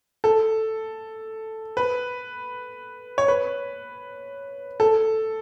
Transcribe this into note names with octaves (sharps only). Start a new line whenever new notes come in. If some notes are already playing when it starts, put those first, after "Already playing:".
A4
B4
C#5
B4
A4